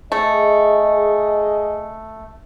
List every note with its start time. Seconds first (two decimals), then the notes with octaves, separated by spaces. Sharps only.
0.12 A3 G#4 D#5